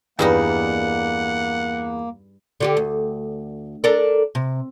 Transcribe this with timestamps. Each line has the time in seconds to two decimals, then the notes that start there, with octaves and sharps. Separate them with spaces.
0.19 E2 G2 G3 A#3 D#4 F#5
2.60 D3 F#4 G4
2.77 D2
3.84 D4 A4 A#4
4.35 C3